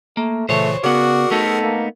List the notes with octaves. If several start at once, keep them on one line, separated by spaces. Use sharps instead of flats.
A3 A#3
A#2 C#3 E3 A3 C5 C#5
C#3 B3 F#4 G#4 A#4 D5 F#5
A3 B3 D#4 A4
A#3